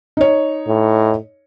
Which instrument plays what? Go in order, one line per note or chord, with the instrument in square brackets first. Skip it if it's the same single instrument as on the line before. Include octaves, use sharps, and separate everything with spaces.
[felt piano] D#4 C#5
[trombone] A2